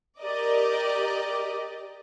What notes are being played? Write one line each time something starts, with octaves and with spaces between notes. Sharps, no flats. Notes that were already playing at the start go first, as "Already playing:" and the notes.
G4 A#4 D5 D#5